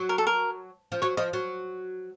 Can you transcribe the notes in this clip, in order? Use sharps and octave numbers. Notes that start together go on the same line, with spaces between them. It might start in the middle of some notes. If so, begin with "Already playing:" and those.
Already playing: F#3
A#4
A4
A#4
F3
F#3 C#5
F3 D#5
F#3